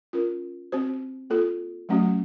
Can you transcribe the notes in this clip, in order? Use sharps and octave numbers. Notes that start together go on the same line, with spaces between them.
C#4 F4 A#4
C4 F#4 C5
A#3 F4 A4
F#3 A3 C#4 F#4